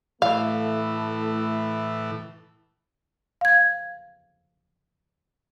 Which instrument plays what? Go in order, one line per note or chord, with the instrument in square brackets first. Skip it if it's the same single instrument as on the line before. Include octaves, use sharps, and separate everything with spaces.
[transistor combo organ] A2 E3 [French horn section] A3 E4 [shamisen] F5
[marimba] F5 G#6